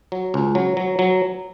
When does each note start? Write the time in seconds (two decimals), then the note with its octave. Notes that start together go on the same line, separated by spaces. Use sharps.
0.12 F#3
0.34 C#2
0.55 F#3
0.77 F#3
0.99 F#3